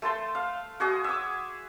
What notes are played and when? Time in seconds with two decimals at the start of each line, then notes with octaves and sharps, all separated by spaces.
0.02 A3 C5 A5 C6
0.35 F5
0.80 F#4 G#4 D#5
1.04 E5 D6